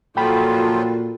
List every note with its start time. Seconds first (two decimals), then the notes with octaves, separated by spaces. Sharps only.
0.17 A#2 F3 F#3 F4 F#4 A4 G5 B5